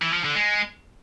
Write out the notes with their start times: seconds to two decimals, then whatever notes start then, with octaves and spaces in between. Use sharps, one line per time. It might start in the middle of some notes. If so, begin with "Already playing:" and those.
0.02 E3
0.13 F3
0.24 D3
0.35 G#3